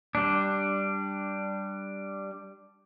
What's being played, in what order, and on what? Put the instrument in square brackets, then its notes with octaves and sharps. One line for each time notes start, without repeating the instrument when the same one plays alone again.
[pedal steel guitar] G3 D4